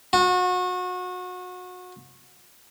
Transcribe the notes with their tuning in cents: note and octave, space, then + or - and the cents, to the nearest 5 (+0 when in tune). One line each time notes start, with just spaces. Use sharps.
F#4 -30